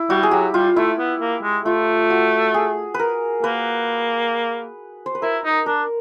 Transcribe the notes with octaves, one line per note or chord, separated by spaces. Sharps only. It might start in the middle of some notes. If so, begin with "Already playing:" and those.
Already playing: E4
G3 F#4
G#4
F#3 G4
G3 F4
A3 E4
B3
A#3
G#3
A3 F4
F#4
G#4
B4
A#4
A#3 B4
C5
B4
E4 A#4
D#4
D4 A#4